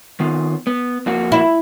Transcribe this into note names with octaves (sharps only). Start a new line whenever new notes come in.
D#3 B3 F4
B3
F2 A#3 F#4
E4